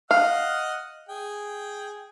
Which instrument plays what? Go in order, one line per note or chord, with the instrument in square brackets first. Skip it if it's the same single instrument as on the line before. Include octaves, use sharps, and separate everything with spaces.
[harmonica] D#5 F#5 F6 [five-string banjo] F5
[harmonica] G#4 G5